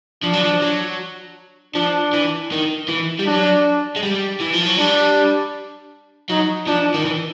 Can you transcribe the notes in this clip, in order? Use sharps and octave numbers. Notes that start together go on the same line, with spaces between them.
F3 D4
F#3
F3
F#3
F3 D4
E3
D#3
E3
G3
F#3 D4
G#3
G3
E3
F3
F#3
G3 D4
F#3 D#4
F3 D4
D#3
E3